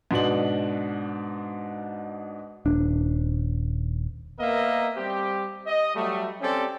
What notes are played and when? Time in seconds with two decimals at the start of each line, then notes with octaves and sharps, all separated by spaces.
0.11 G#2 B2 D4 F#7
2.65 D#1 D4
4.39 A#3 B3 A#4 D#5 E5
4.96 G3 C4 G4
5.67 D#5
5.95 F#3 G3 A3
6.41 C4 C#4 G4 A4 D5